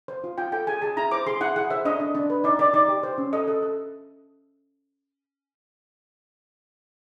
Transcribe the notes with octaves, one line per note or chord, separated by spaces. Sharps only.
C5
F4
F4 G5
A4 G5
G#4 G#5
G#4 A5
E4 A#5
C5 D6
G#4 C6
E4 F#5
G#4 F#5
C5 E5
D4 D#5
D4
D4
B4
D#4 D5
D#4 D5
D#4 D5
G4
C5
C#4
A4 D#5
A4
A4